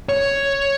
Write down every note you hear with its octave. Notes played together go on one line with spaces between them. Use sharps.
C#5